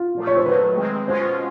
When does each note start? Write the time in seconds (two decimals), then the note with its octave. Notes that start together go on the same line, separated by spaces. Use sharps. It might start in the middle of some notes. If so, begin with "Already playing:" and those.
Already playing: F4
0.15 A#2 F3 A3
0.27 C#5
0.37 C5
0.46 D#3 F#3 A3 B4
0.77 D#3 G#3 C4
1.08 B2 G#3 C#4 F4 C5